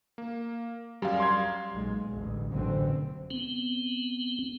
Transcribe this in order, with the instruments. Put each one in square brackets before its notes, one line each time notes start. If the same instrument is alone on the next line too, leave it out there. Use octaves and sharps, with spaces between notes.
[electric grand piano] A#3
[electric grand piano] F#2 F5 [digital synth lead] G3
[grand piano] C6 G#6
[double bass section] B1 A#2 G#3
A1 D2
A1 F#2 B2 D3 C4
[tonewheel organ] B3 C4